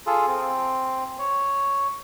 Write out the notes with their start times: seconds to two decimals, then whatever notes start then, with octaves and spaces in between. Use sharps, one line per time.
0.07 F4 G#4 A4
0.27 C4
1.19 C#5